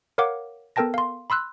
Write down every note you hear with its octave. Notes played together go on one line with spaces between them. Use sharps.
A#4 C#5 F5 F#5 D6
B3 A4 A#4 G5 A5 A#6
F5 C6
B5 C6 E6 F#6